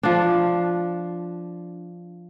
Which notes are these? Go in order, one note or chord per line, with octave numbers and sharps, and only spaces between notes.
F3 D4